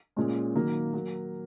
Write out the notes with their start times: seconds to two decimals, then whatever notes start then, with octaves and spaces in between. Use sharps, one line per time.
0.17 A#2 G#3 C#4
0.55 D#3 F#3 A#3
0.93 F#3 A#3